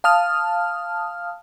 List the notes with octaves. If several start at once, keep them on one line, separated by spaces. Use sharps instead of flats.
F5 A5 D#6 F6